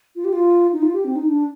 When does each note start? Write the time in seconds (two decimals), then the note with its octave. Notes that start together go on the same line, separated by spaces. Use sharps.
0.16 F4
0.25 G4
0.33 F4
0.73 D#4
0.82 F4
0.94 G4
1.05 C4
1.16 D#4
1.27 D4